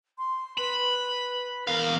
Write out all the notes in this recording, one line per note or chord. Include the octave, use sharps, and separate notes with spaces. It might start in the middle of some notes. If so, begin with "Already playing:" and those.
C6
B4 B5
E2 A#4 F5